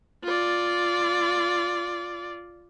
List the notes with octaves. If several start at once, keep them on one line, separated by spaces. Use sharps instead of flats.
F4 D5